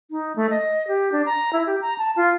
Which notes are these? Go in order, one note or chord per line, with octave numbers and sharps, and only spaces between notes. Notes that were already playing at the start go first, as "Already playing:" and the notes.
D#4
A3
D#5
G4
D4
A#5
E4
G4
A#5
A5
F4